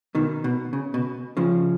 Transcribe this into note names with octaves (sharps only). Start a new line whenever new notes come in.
B2 D#3
B2
C#3
B2
C#3 F3